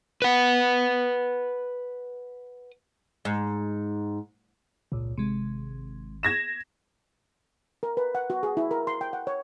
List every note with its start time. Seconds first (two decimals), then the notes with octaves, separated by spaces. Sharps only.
0.22 B4 F#5
3.25 G#2
4.92 G#1 C#2 A#2
5.18 G#1 C3 G#3
6.23 G#6 A#6 E7
7.83 A#4
7.97 B4
8.15 F#5
8.30 F#4
8.43 G#4
8.57 E4
8.71 A#4
8.87 C6
9.01 G5
9.13 F#5
9.27 C#5